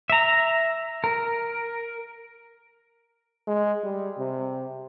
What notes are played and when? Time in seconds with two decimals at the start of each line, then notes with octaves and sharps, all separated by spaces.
0.10 E5 A#5
1.04 A#4
3.48 G#3
3.84 G3
4.18 C3